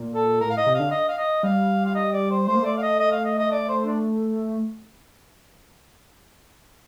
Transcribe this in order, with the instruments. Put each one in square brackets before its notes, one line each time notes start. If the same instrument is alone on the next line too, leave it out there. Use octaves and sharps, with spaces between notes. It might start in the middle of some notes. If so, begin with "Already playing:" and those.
Already playing: [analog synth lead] A#2
[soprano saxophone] A4
[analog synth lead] A2 [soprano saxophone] A#4
[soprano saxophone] F5
D#5
[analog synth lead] C3
[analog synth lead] D3 [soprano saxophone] F5
[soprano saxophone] D#5
F5
D#5
[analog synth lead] G3 [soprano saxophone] F5
[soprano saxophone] F5
D#5
D5
C5
[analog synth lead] A3 [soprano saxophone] C5
[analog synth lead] A#3
[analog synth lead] A3 [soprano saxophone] D5
[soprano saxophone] F5
D#5
D#5
F5
D#5
D#5
D5
C5
D4